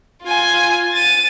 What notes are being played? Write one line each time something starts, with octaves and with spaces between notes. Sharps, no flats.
F4 G#5
A6 D#7